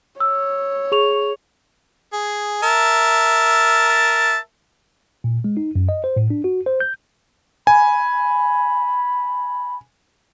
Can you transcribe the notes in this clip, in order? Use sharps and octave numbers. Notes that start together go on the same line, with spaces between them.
C#5 E6
G#4 C#6 F7
G#4
A#4 E5 A5
A#2
G#3
D#4
F#2
D#5
C5
A2
D4
F#4
C5
G6
G#5 B5